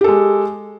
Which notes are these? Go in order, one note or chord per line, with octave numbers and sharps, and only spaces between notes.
G#3 G4 A4